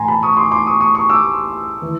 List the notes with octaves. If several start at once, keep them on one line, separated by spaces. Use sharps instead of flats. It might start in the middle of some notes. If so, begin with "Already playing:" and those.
Already playing: A2 E3 G#5 A#5 C6
A5 B5
C#6 D#6
D#6
C6 D6
C6 D6
C#6 D#6
C#6 D#6
C#6 D#6
D6 E6
E3